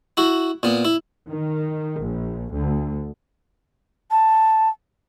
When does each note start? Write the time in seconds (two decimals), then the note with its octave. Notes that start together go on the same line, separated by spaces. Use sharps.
0.17 E4 F#4
0.63 A#2 B3
0.85 E4
1.29 D#3
2.00 A#1
2.53 D2
4.11 A5